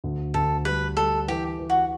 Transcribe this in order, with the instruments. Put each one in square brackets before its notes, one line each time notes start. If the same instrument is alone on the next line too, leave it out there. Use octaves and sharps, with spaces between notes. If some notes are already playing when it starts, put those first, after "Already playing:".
[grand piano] D2
[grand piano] D2 [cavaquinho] A4
[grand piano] G3 [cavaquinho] B4
[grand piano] G3 [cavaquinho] A4
[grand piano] E3 [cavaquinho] G4
[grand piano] E3
[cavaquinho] F#4